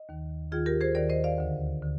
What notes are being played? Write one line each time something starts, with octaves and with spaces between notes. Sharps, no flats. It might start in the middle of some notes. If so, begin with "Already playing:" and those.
Already playing: D#5
D#2 D#3
D#2 D#3 F4 G#4
G4 A#4
G#4 C5
D#2 D#3 A#4 D5
C5 D#5
D5 F5
D2 D3
D3